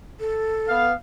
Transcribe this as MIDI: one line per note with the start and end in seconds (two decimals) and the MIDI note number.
0.20 0.84 69
0.68 0.93 59
0.68 0.93 77